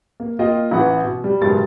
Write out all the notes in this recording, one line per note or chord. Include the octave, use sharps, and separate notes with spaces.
A#3
A#3 F4 D#5 G5
A1 E3 B4 F#5
B2
G3
F#1 G#2 B2 G4 A6